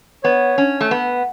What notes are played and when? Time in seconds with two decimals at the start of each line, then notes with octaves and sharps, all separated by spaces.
0.24 B3 C#5
0.58 C#4
0.81 A3
0.91 B3